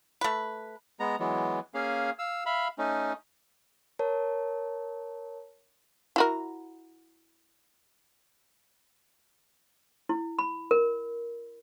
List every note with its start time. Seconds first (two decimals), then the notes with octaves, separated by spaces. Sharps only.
0.21 A3 B4
1.00 G#3 B3 A#5
1.20 E3 F#3 G#3 B3
1.74 A#3 C#4 G#4 F5
2.19 F5 E6
2.46 E5 F5 B5
2.78 A3 C#4 D#4
3.99 A#4 C#5 A5
6.16 E4 F#4 A#4
10.09 E4
10.39 B5
10.71 A#4